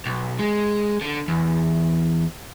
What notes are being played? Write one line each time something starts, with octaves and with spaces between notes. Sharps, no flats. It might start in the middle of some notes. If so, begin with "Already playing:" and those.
B1
G#3
D3
E2